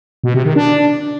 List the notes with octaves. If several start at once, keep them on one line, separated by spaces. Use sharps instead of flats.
B2
C3
D#3
D4